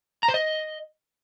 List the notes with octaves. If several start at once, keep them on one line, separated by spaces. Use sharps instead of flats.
A#5
C5
D#5